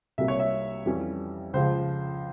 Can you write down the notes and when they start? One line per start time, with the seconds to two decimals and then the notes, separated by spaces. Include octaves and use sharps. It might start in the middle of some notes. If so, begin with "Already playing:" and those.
0.18 C2 C3 G3 A#3 E5
0.28 C#5
0.40 E5
0.86 F2 E3 G3 C#4
1.53 C#2 C#3 F3 C5